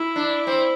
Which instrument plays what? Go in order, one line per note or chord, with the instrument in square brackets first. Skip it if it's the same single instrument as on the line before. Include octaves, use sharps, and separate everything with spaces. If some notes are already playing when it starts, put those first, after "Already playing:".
Already playing: [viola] E4
[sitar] D4
C4